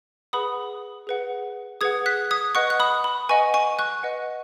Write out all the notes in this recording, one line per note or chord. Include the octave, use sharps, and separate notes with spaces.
G#4 B4 F#5 B5 D#6
G#4 B4 F#5
G#4 B4 F#5 D#6 G#6
F#6 B6
D#6 G#6
B4 D#5 F#5 C#6 F#6
F#6
B5 D#6
B5
B4 D#5 F#5 G#5 C#6
G#5 C#6
C#6 F#6
B4 D#5 F#5